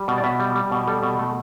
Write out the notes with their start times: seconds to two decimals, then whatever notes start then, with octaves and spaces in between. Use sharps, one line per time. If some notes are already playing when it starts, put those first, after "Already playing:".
Already playing: G3
0.08 B2
0.18 D5
0.24 B2 E5
0.40 G3
0.55 G3
0.72 B2
0.87 G3 A4
1.03 B2
1.19 A3 A4